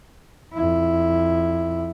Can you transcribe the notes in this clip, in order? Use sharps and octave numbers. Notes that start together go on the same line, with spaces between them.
F2 E4